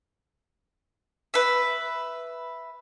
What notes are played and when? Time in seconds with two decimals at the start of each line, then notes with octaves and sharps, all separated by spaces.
1.34 B4 E5